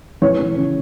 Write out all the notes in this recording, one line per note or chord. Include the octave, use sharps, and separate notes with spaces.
E3 C#5
E3
C#3